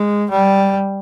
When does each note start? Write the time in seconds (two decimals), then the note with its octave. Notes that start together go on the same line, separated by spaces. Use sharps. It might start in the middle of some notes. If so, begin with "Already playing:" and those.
Already playing: G#3
0.31 G3